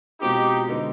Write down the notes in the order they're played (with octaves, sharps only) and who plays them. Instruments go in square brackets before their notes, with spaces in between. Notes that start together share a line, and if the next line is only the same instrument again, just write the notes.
[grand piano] B2 G#3 C4 F4 [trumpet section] D#4 G4
[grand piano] D3 G#3 B3 D#4